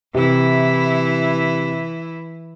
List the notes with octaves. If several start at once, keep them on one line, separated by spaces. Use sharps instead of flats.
C3 E3 E4